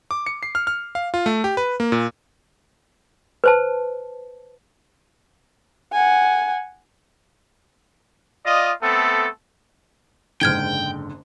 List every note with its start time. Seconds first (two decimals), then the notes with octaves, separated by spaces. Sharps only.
0.11 D6
0.26 C#7
0.43 C7
0.55 F6
0.67 F6
0.95 F5
1.14 F4
1.26 A3
1.44 G4
1.57 B4
1.80 A#3
1.92 A#2
3.44 B4 C5 A5
5.92 F#5 G#5
8.44 F4 D5 D#5
8.82 A3 B3 C4 A4
10.41 F#1 G#2 D3 G5 F6 G#6 G7